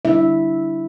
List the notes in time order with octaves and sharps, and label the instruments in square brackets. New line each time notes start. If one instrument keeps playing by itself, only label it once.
[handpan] D3 G3 D4 E4 E5